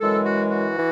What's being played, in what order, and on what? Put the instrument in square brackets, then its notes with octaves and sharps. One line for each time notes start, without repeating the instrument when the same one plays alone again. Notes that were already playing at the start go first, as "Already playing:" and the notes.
[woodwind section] F#2 E3 G#3 A4
F#4
F#4
E3